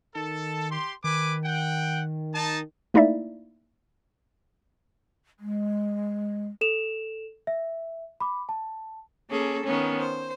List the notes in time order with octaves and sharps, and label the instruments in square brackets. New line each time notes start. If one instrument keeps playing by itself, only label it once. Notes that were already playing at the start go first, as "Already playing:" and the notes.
[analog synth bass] D#3 [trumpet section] A4
[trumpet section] G4 C6
[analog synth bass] D#3 [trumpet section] B4 G#5 D6
[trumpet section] F#5 G5
D#4 A5
[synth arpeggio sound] A3 A#3 D#4 E4 D5 E5
[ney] G#3
[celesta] A4 E7 F7
E5
B5 D6
A5
[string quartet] A#3 C#4 G#4 A4
D#3 B3 C#4
C5